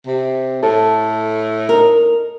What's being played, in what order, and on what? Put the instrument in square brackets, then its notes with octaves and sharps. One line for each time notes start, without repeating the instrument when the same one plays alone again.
[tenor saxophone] C3
[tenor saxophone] A2 [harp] A4
[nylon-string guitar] D#4 A#4